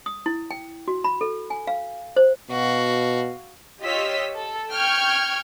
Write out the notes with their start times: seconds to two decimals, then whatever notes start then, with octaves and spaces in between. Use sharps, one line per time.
0.06 D#6
0.26 E4
0.51 G5
0.88 F#4
1.04 B5
1.21 A4
1.50 G#5
1.67 F5
2.16 C5
2.51 B2 F#4 F5
3.82 F4 G4 C#5 D#5 E6 B6
4.36 A4
4.71 G5 C#6 F6 G6 G#6